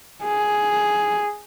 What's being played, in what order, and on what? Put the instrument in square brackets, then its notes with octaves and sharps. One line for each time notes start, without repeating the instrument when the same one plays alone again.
[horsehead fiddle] G#4